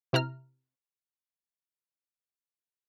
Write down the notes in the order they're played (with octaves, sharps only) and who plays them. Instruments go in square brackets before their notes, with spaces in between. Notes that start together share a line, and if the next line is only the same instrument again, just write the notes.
[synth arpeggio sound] C3 E4 A#5 F6